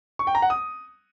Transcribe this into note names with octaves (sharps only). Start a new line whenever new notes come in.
C#6
G5
A#5
F#5
D#6